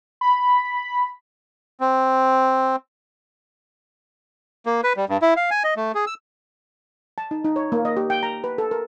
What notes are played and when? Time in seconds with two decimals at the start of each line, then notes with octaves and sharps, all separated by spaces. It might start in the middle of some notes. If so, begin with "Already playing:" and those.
0.21 B5
1.80 C4
4.66 A#3
4.84 B4
4.97 G3
5.09 G2
5.22 E4
5.37 F5
5.51 G#5
5.64 D#5
5.77 A3
5.95 G#4
6.07 E6
7.18 A5
7.31 D#4
7.44 D#4
7.56 C#5
7.72 A#3
7.85 D#5
7.97 G4
8.10 G5
8.23 A#5
8.44 B4
8.58 A4
8.71 A#4